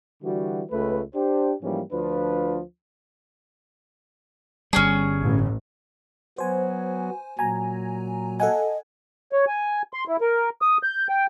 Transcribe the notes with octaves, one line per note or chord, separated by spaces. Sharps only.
D3 E3 G3 F#4
C#2 A3 B4
D4 G4 C5
G#2 E3 F3 G3 A#3 C#4
D2 F3 D4 F4 B4
G1 G3 C#4 D4 G#4
A1 A2
F#3 B3 F#4 C5 G#5
A#2 F#3 G#5 A#5
A4 D#5 F#5 G#5
C#5
G#5
C6
E4
A#4
D#6
G6
G5